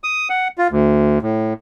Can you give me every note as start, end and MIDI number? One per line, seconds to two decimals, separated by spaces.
0.04 0.28 87
0.29 0.48 78
0.58 0.68 65
0.71 1.19 38
1.22 1.53 45